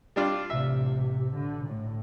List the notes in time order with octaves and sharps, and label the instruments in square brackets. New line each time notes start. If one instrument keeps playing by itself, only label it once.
[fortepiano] G3 D4 F4
[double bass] A1 C3 [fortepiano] E5
[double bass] D3
A2